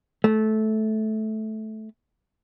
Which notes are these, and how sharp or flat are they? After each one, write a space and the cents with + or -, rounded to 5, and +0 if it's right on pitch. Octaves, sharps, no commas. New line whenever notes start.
A3 -15